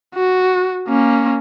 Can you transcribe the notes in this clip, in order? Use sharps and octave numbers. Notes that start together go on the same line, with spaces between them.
F#4
A#3 C#4